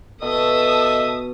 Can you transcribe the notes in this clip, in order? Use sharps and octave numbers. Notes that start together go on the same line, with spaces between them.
B2 A4 D#5 E5 A5 D#6